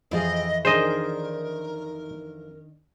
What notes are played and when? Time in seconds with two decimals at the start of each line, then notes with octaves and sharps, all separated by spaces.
0.11 F2 E3 C4 F4 G#4 D#5
0.65 D#3 D4 G#4 A#4 C5 D#5